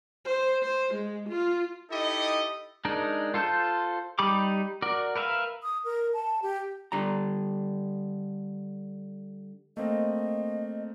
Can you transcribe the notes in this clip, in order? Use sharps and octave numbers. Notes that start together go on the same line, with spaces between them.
C5
C5
G#3
F4
D#4 E4 G4 A4 D#5
G#3 D4 D#4 A#4
F4 A4 C5 A5 G6
G3 D#4 G4 B5 D6
F#4 A#4 D5
A#4 B4 E5 F5
D#6
A#4
A5
G4
D3 G3 A#5
A3 A#3 C4 D#5